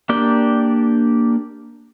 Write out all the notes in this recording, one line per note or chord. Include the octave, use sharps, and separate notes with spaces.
A#3 D4 G4 D5 G5